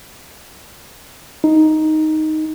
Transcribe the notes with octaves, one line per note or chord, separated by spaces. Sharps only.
D#4